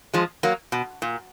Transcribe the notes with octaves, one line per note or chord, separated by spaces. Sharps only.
F3 G#3
F#3 A#3
B2
A#2